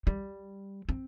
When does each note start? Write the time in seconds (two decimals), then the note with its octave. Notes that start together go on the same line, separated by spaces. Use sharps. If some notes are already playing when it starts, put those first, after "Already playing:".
0.07 G3
0.89 C4